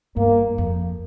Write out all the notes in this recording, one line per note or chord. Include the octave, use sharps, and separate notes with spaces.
G2 A#3
F2